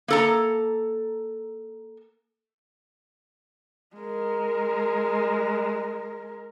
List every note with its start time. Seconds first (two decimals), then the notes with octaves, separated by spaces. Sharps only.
0.08 A#3 A4 A#5
3.96 G#3 A#4